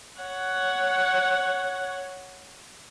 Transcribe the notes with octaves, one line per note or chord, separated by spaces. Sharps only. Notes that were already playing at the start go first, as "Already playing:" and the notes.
C#5 F#5